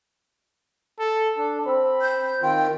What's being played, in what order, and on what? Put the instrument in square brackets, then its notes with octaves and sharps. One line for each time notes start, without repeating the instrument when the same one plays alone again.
[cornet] A4
[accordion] D4 [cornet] A4
[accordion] C4 [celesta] C5 E6 [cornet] B5
[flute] G6
[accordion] D#3 C4 F4 [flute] G5